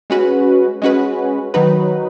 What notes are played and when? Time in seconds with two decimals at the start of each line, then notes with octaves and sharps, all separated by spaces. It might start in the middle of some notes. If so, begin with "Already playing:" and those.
0.10 G#3 C#4 F#4 B4
0.82 G#3 C#4 F#4 B4
1.54 D#3 F#3 D#4 F#4 B4